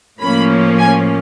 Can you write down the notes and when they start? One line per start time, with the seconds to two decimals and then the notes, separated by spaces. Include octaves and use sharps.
0.20 A2 F3 A#3 C#4 B5
0.79 G#5